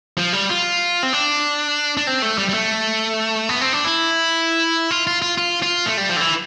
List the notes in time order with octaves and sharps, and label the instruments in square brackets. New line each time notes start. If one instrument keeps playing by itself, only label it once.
[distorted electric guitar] F3
G3
F4
C4
D4
D4
C4
A3
G3
G3
A3
B3
C4
D4
E4
F4
F4
F4
F4
F4
A3
G3
F3
D3
E3